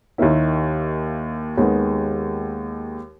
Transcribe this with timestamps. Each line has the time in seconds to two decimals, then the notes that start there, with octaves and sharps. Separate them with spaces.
0.18 D#2 D#3 A#3 E4
1.58 D#2 D#3 G#3 B3